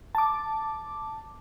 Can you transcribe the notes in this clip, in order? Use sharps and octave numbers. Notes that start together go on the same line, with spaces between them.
A5 D6